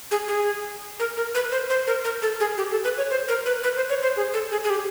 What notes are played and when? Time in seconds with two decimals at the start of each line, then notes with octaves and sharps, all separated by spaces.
0.11 G#4
0.28 G#4
0.99 A#4
1.17 A#4
1.35 B4
1.52 C5
1.70 C5
1.87 A#4
2.04 A#4
2.22 A4
2.40 G#4
2.57 G4
2.71 A4
2.84 B4
2.98 C#5
3.11 C5
3.28 A#4
3.46 B4
3.63 B4
3.76 C5
3.89 C#5
4.03 C5
4.17 G#4
4.34 A4
4.52 G#4
4.64 G#4
4.70 G4